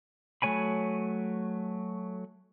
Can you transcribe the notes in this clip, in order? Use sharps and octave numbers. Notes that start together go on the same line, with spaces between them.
F#3 A3 C#5 G#5 B5